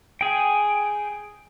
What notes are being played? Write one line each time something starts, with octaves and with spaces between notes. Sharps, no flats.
G#4 G5